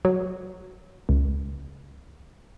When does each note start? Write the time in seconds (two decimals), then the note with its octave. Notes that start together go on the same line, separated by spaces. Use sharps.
0.05 F#3
1.09 C#2